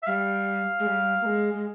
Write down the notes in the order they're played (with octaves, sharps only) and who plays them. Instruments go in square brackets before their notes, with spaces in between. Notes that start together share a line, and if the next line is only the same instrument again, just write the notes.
[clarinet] E5
[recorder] G3 [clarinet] F5
[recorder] G#3
G3
A#3
G#3
G#3